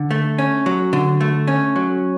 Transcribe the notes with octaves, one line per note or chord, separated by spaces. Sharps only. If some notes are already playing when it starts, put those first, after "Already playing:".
Already playing: D3
A3
C#4
F#3
D3
A3
C#4
F#3